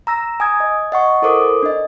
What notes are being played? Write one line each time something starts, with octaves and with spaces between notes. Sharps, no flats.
A#5 E6 A#6
G#5 D#6 G#6
D#5
D#5 F#5 C#6
E4 A4 A#4 C5 D6 D#6
D4 D#5